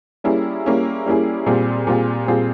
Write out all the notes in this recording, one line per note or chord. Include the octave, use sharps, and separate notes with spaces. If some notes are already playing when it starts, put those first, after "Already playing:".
G3 A#3 C#4 E4 G#4
G3 A#3 C#4 E4 G#4
G3 A#3 C#4 E4 G#4
A#2 G3 C4 F4 G#4
A#2 G3 C4 F4 G#4
A#2 G3 C4 F4 G#4